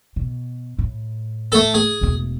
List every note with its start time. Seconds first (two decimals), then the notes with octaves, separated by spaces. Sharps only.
0.16 B2
0.78 A2
1.52 A3 A4
1.74 G#4
2.01 E1 A3